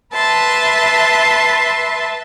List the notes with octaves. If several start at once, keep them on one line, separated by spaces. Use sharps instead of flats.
B4 E5 A5 C6